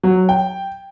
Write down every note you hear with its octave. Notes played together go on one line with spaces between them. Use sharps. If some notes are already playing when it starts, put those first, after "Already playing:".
F#3
G5